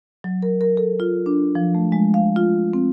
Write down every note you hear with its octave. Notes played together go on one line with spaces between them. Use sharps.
F#3
A#4
A#4
A4
F4
D4
F3
A3
G#3
F5
F4
C4